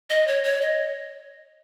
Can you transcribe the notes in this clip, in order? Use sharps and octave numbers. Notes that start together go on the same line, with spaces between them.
D#5
C#5
C#5
D#5